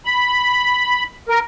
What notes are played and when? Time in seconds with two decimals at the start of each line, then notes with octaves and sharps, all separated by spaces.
0.05 B5
1.29 A#4